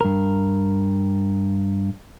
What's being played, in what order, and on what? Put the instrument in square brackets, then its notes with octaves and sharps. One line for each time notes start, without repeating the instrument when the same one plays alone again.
[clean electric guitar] G2 A#4